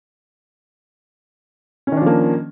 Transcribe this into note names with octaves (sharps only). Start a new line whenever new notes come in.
D#3 F3 A#3 C#4 D4